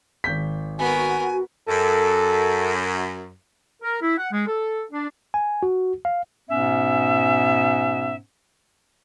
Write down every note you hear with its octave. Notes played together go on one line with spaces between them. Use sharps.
G#1 G6 B6
B3 F#4 A#4 G#5
F#2 A4
A#4
E4
F#5
G#3
A4
D4
G#5
F#4
F5
G#2 B2 B3 C#4 E5